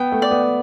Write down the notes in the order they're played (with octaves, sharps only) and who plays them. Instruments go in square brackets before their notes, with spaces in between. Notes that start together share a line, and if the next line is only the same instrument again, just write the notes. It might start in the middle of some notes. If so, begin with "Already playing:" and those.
Already playing: [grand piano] B3 [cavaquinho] G5
[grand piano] A3
[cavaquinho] D5
[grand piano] B3